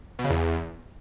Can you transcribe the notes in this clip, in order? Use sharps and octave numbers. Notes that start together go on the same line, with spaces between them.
B2
C#3
E2